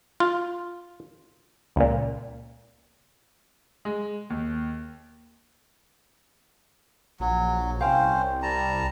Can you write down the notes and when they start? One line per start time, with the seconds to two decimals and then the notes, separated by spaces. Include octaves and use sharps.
0.20 F4
1.76 C#2 A#2
3.85 G#3
4.30 D#2
7.20 A#1 F#3
7.81 C2 C#4 C5 F5 G5
8.43 G3 A5 A#5